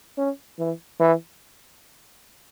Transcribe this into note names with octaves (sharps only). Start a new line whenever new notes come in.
C#4
E3
E3